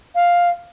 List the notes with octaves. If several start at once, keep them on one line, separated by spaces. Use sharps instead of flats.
F5